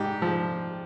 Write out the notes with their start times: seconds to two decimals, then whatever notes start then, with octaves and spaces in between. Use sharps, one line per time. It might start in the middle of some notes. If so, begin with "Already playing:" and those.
Already playing: G#2 G4
0.22 F3